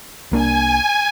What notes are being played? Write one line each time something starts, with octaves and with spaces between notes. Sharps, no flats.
C2 A#3 D4 G#5